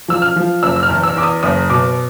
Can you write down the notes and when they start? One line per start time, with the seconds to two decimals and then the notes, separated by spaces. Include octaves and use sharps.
0.08 F3 E6
0.22 F6
0.36 F3
0.63 F#1 E6
0.76 E6
0.83 F6
0.89 E2
1.03 E6
1.16 E2 D6
1.23 D#6
1.43 F#1 D#6
1.70 B2 D6